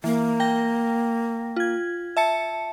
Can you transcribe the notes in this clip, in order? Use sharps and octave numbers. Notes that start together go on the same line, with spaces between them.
E3 A#3
G5 A#6
F4 G#6
E5 A5 C#7